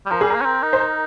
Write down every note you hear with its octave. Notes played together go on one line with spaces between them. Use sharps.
G3
F3 A#4
G3 G#4
A#3 A#4
C#4
C4
D#4
C5
A#4